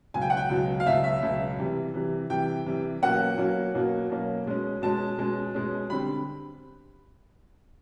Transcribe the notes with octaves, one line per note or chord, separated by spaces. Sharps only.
C#2 B2 F#3 G#5
G5
F#5
G5
C#2 B2 F#3
F5
C#2 B2 F#3 E5
E5
C#2 B2 F#3
C3 E3 G3
C3 E3 G3
C3 E3 G3 G5
C3 E3 G3
B2 F#3 A#3 C#4 F#5
B2 F#3 A#3 C#4
B2 F#3 A#3 C#4
B2 F#3 A#3 C#4
B2 G#3 C#4
B2 G#3 C#4 A5
B2 G#3 C#4
B2 G#3 C#4
D3 G3 C4 B5